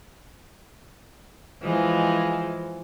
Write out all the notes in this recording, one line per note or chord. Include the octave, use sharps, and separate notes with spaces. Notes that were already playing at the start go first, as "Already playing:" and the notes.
E3 F3 G#3